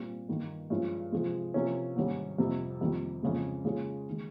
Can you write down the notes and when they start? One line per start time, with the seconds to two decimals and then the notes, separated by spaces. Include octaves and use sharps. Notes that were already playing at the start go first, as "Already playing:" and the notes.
Already playing: A#2 G3 C4
0.28 G2 D#3 G3 A#3 D#4
0.70 G2 F3 G#3 C#4 F4
1.12 C3 F3 G#3
1.54 C3 F3 A#3 C#4
1.96 G#2 D#3 G3 C#4
2.38 F2 C3 G3
2.81 F2 D#3 G3
3.23 F2 C#3 G#3
3.65 C#3 G#3 C#4 F4
4.09 D#3 G#3